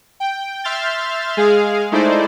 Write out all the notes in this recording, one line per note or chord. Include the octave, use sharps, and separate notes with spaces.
G5
E5 C6 F6 G6 A6
G#3 G#4 F5
G#3 A3 D#4 E4 C5 D5